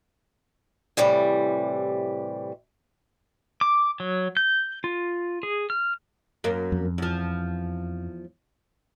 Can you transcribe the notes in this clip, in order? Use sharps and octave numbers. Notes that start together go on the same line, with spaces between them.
A2 C3 E3 G3
D6
F#3
G6
F4
G#4
F6
F#2 A#3
F2
E2 F3